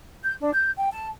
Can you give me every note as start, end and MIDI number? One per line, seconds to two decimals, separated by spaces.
0.24 0.34 91
0.40 0.51 62
0.53 0.71 91
0.76 0.88 79
0.91 1.07 81